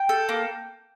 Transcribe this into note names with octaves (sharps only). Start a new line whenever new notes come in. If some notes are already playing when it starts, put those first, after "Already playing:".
Already playing: G5
A4
A#3